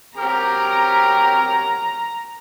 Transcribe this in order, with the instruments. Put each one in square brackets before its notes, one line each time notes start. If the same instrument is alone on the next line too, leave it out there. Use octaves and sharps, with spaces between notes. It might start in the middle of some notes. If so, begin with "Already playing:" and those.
[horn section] F#3 A#4 [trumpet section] C4 G4 [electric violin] A#5